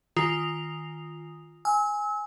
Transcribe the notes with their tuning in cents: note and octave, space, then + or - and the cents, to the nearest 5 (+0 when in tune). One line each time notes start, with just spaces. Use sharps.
D#3 +0 F4 +0 D#6 +0
G#5 +0 E6 -35